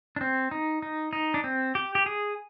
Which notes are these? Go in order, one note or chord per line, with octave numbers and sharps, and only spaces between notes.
D4
C4
D#4
D#4
D#4
D4
C4
G4
G4
G#4